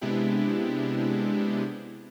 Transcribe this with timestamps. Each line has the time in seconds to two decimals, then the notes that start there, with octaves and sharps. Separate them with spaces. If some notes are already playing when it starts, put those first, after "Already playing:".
0.01 C3 G#3 B3 D4 E4 G4